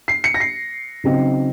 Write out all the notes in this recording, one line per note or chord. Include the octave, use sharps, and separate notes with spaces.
C7
C#7
A#6
C7
C#3 F#3 C4 D#4